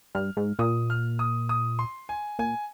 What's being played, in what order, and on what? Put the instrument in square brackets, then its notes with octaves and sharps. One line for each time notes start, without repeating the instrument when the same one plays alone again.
[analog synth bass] G2 [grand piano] F6
[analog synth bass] G#2
[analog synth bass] A#2 [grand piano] D#6
[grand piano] F6
D#6
D#6
C6
G#5
[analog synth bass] A#2 [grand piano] G#5